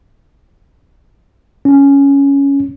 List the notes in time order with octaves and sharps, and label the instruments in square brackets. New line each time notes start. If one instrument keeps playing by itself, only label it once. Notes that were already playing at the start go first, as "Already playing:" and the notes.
[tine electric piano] C#4